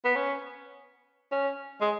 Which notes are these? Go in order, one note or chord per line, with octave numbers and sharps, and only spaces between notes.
B3
C#4
C#4
G#3